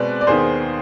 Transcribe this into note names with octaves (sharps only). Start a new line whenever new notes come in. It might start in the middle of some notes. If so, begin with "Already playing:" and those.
Already playing: B2 G#3 C4 B4 D5
D5
D#2 D#3 B3 G#4 C5